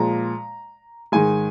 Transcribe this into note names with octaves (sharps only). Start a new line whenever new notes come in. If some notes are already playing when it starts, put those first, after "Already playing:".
Already playing: A#2 F3 G#3 A#5
G#2 D#3 G#3 G#5